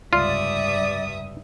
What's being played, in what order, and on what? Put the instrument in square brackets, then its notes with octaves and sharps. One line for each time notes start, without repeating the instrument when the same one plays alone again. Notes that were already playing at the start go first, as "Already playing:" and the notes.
[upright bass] F1 C#2 [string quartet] G2 E5 D#6 [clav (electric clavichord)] F4 [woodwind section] D5